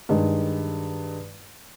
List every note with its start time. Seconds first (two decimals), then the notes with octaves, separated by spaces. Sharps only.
0.09 G2 D#3 G#3